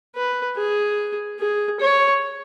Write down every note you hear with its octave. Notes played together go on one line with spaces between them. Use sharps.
B4
G#4
G#4
C#5